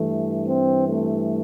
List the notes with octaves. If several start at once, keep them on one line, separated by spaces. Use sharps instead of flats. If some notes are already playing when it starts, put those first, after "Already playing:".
Already playing: G2 E3 A3
C4
A3